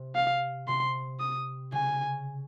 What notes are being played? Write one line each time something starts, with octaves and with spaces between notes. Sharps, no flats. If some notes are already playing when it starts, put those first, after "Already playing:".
Already playing: C3
F5
C3 C6
D#6
C#3 G#5